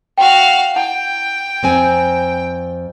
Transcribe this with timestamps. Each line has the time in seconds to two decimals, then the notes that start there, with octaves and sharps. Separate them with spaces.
0.18 F#4 F5 G5
0.76 E4 F#5 G5 A5
1.63 F2 C4 G#5